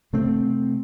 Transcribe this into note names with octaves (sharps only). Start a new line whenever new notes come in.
C3 A3 C4